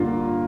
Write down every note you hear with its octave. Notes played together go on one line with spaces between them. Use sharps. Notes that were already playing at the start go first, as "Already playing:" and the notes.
Already playing: G2 D3 A#3 F4